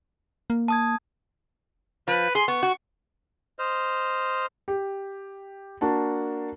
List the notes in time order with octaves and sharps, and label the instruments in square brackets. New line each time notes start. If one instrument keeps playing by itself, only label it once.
[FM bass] A#3
[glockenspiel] A5 D#6 G#6
[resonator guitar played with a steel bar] F3 [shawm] B4
[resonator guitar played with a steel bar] G#4 [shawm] C6
[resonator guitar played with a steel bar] B3 [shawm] C#6
[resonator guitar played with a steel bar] F#4
[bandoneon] C5 D#5 F6
[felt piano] G4
A#3 D4 F#4 A5